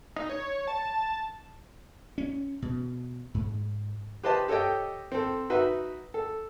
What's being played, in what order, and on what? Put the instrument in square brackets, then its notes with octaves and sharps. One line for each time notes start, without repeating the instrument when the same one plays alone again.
[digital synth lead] D#4
C#5
A5
[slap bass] C#4
B2
G#2
[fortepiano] G4 B4 C5 D#5 A5
G4 A4 C#5 D#5 G5
C4 A4
D#4 F#4 B4 E5
A4